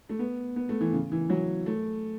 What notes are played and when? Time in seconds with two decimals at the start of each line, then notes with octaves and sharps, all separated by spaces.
0.09 A3
0.19 B3
0.56 B3
0.69 A3
0.81 E3
0.93 C#3
1.12 E3
1.30 F#3
1.66 A3